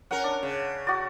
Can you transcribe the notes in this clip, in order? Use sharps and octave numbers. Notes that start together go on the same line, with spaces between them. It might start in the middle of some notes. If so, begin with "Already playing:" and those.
C#4 A#4 F#5
D4
C#3
F#4 D5